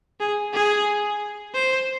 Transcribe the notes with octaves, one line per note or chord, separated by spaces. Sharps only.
G#4
G#4
C5